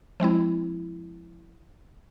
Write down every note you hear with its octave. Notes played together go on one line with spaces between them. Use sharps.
F3 G#3 C4 E4